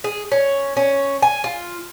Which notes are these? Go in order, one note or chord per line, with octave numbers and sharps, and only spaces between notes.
G#4
C#4
C#4
G#5
F4